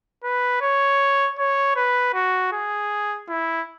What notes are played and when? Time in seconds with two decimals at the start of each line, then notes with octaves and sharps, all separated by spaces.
0.24 B4
0.62 C#5
1.38 C#5
1.76 B4
2.14 F#4
2.52 G#4
3.29 E4